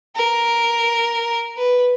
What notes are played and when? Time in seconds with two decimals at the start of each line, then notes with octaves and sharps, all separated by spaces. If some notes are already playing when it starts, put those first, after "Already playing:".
0.16 A#4
1.56 B4